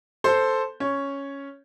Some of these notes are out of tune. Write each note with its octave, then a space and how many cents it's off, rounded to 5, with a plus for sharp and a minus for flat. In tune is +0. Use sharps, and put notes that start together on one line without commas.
A4 +0 C5 +0 C6 +0
C#4 +0 C#5 +0